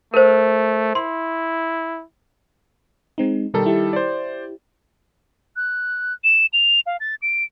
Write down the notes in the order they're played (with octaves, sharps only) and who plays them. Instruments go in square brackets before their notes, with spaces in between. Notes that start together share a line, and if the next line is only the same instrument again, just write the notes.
[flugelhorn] A3 [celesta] A#4 C5
[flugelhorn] E4 [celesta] C6
[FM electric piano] G#3 C4 D#4
[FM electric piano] B2 A#4 [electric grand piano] D#3 G3 A4
[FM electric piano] E4 G4
[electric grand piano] C5 D5
[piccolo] F#6
E7
F7
F5
A6
D7